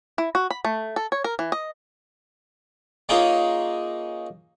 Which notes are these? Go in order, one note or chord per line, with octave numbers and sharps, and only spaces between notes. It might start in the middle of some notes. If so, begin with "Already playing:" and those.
E4
F#4
B5
A3
A4
C#5
A#4
E3
D#5
A#3 C#4 D#4 F4 G#4 C#5